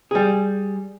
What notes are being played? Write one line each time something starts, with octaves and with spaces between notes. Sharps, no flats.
G3 G#4